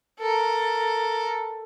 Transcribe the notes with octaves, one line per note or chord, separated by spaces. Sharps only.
A4 A#4